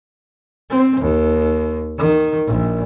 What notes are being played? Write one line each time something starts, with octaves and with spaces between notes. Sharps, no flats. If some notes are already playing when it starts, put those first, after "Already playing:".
C4
D#2
D#3
A#1